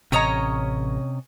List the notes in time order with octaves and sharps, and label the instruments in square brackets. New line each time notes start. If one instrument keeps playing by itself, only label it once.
[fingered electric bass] A1 [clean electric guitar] C3 A#5 [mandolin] C#4 C#5 D#5